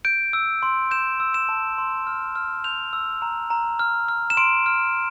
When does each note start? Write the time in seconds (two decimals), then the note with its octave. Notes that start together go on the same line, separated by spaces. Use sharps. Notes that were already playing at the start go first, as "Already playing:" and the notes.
0.05 G6 D7
0.33 E6
0.63 C6
0.91 G6 E7
1.20 E6
1.34 E7
1.49 A5
1.78 C6
2.07 F6
2.36 F6
2.64 G6 F7
2.93 E6
3.22 A#5
3.50 A#5
3.79 F6
4.08 F6
4.30 E7
4.37 C6 D7
4.66 F6